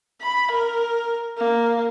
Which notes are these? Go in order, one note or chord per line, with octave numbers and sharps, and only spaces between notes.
B5
A#4
A#3